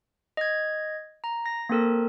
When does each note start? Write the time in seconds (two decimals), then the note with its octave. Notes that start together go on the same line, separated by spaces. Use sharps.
0.37 D#5 G#6
1.24 A#5
1.46 A#6
1.69 A#3 C4 A4 A#4